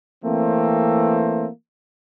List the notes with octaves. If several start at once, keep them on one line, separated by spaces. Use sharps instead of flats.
E3 A3 A#3 C4